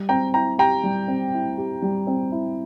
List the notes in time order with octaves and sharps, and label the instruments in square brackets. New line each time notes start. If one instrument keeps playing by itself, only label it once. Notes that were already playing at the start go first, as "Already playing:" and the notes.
Already playing: [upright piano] G3
[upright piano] C4 [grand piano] G5 A#5
[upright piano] E4 [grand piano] G5 A#5
[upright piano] G4 [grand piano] G5 A#5
[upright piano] G3
C4
E4
G4
G3
C4
E4